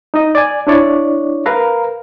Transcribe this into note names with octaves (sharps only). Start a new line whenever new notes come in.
D#4 D#5
D5 G#5
D4 E4 C#5 D5
A#4 B4 F5 A#5